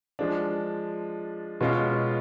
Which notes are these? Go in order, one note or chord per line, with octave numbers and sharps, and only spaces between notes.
F3 G#3 D4
B2 G#3 C#4 F4